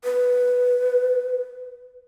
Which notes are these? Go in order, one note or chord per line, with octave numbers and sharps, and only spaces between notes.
B4